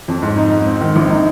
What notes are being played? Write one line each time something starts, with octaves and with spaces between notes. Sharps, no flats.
F2
G#2
D#4
G#2
C4
D#3
A#1
D#4